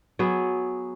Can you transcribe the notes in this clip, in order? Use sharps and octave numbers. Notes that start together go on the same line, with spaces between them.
F#3 B3 G#4